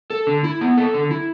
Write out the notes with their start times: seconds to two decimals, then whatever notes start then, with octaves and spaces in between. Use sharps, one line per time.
0.10 A4
0.27 D3
0.44 E4
0.61 B3
0.78 A4
0.94 D3
1.11 E4